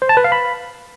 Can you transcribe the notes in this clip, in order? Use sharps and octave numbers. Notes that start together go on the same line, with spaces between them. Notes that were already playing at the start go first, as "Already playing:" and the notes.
C5
A5
B4
F5
B5